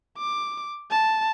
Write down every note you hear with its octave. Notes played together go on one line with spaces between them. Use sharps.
D6
A5